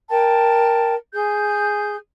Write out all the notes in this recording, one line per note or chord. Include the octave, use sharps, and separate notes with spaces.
A#4 G5 A5
G#4 G6